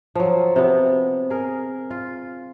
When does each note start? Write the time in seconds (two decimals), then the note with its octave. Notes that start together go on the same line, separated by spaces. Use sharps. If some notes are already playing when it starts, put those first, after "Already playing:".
0.15 F3 F#3
0.56 C3 B3
1.30 G#4 A#4
1.91 F4